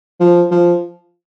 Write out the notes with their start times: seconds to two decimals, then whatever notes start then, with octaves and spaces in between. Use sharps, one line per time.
0.20 F3
0.51 F3